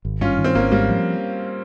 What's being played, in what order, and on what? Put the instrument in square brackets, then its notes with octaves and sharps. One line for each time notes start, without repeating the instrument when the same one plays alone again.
[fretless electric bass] G#1
[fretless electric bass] G2 [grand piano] C#4 F4
[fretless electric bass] D#3
[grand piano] C4
[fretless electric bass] G#1 [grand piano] A#3 C#4
[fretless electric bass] G#2 [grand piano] G3 A#3
[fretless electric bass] F3